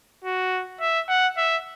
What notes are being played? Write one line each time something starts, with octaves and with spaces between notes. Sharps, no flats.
F#4
E5
F#5
E5